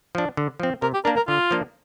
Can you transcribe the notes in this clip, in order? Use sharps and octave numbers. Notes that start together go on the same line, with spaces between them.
F3 D4
D3
F3 C4
C3 A#4
G4
A#3 D4 A#4
A#4
D3 F4
F3 A#3 D4